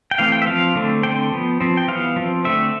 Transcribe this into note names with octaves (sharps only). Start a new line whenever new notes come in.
G5
E3 A3 C4 F5
G5
E5
F3 C4 F5
D3 A3 C4
D3 A3 C4 G5
F3 B3
F3 C4
G5
E3 G3 B3 F5
F3 C4
D3 A3 C4 E5